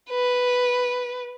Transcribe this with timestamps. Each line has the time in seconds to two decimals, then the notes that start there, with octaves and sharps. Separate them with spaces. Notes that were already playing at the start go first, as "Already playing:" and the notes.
0.10 B4